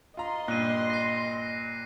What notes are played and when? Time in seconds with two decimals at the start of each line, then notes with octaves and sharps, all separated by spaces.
0.17 F4 D#5 A#5 C6
0.48 G2 A#2 F#6 D#7
0.90 A#6 C7